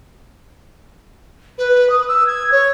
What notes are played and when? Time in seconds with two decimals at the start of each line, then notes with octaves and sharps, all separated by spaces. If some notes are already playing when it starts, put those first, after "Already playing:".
1.58 B4
1.90 D#6
2.08 E6
2.27 G#6
2.52 C#5